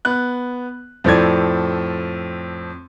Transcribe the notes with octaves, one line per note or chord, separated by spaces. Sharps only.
B3 F#6
F2 A2 C4 A4 D5 G#6